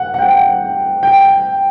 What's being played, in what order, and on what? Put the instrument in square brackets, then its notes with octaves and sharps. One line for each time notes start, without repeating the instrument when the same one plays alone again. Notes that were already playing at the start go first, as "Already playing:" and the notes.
Already playing: [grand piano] F#5
F#5
G5
G5